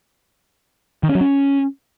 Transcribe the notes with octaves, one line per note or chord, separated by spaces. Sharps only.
D#3
C#4
F#3
C#4